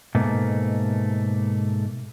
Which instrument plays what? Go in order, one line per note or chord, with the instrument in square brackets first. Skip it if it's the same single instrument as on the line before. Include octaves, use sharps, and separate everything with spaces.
[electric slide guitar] G#2 B2 A3 A#3